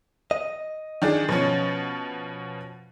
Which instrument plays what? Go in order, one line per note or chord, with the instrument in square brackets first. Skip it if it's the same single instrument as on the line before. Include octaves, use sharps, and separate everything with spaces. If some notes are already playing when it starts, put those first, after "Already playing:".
[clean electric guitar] D#5
[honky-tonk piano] D#3 D4 G#4
B2 F3 C#4